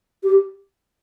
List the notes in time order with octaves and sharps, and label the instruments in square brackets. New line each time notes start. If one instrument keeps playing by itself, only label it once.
[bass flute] G4